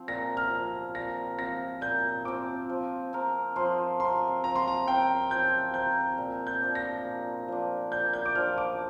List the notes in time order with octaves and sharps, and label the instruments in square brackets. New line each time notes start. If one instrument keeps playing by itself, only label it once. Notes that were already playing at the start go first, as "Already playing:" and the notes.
Already playing: [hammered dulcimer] F3 C4
[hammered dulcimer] A#2 [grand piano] A#6
[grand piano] F6
[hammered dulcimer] F3 C4
[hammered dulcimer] A#2 [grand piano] A#6
[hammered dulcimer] F3 C4 [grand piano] A#6
[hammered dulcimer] A#2 [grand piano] G6
[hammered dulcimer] F3 C4 [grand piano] D6
[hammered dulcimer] F3
C4 A#4
[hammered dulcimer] F3 [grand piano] C6
[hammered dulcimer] C4 A#4 [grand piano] C6
[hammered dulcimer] F3 [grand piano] A#5
[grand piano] C6
A#5
[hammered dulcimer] C4 A#4 [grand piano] G5
[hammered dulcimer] F3 [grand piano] G6
[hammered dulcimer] C4 A#4 [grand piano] G6
[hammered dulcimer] A#2
[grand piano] G6
[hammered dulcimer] F3 D4
[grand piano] A#6
[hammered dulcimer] A#2
F3 D4
[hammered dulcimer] A#2 [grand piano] G6
[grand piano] G6
D6
[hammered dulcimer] F3 D4 [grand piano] F6
[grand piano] D6